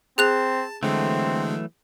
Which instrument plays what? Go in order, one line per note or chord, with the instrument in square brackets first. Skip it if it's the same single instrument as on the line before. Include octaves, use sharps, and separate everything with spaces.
[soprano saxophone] C4 [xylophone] G#4 F#6 F7 [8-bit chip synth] A5
[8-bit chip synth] D3 G#3 [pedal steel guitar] E3 F#3 A3 [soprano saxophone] C4